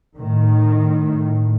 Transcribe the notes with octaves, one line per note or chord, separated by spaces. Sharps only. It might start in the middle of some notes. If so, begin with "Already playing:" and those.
A2 D#3